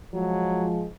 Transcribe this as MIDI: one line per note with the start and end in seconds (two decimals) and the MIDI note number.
0.14 0.86 53
0.14 0.67 54
0.14 0.86 56